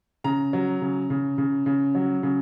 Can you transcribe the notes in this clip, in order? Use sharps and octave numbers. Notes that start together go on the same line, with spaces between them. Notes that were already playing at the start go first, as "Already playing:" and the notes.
C#3 A#5
F#3
C#3
C#3
C#3
C#3
F#3
C#3